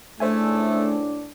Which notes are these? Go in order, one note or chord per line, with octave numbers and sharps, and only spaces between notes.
C#2 A2 A3 D4 C5 E5 G#5